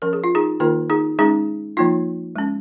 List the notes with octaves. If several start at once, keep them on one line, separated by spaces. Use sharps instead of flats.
F3 C#4 A#4
G#4
F4
D#4 G#4
D#3 A#3 D#4 F4 A#4
D#4 G#4
G#3 C#4 D#4 G#4
F3 A#3 D#4 F4
G#3 C#4